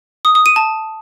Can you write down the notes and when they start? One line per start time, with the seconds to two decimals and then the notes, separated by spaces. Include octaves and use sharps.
0.25 D#6
0.35 D#6
0.46 D#7
0.56 A5